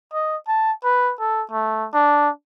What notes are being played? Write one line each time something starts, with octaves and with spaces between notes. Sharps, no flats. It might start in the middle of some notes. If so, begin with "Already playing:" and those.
D#5
A5
B4
A4
A3
D4